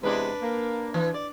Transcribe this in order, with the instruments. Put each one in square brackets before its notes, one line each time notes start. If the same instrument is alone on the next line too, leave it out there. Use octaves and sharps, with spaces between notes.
[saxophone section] E2 C3 G#3 [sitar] D4 B4
[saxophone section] A#3
[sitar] E3
D5